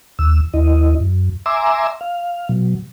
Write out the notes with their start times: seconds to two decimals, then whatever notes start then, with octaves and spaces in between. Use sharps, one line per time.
0.19 D#2 E6
0.54 D#2 E4 D#5
1.00 F#2
1.46 E5 G#5 A#5 C6 D6 E6
2.01 F5
2.49 B2 F#3